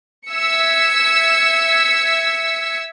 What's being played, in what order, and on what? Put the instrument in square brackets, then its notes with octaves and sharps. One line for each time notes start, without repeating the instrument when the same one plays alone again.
[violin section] E5 E6 G#6 B6 C#7